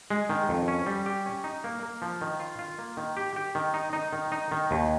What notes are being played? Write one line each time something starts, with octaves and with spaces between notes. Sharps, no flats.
G#3
D#3
F2
C#4
G3
G4
C#4
D#4
A#3
A#3
F3
D#3
F4
F4
A#3
D#3
G4
G4
D#3
D#4
D#4
D#3
D#4
D#3
D#2